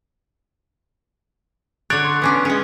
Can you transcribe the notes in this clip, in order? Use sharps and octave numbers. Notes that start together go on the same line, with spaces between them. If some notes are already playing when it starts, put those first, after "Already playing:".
D3 C#5 F#6 A6 D7
C6
B3 C#4 D4
G#3 C#4